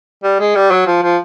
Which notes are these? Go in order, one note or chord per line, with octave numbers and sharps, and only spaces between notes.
G3
G#3
G3
F#3
F3
F3